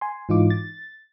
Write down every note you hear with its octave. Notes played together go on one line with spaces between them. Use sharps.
G#5 C6
G#2 E3 D#4 F4 D6
A6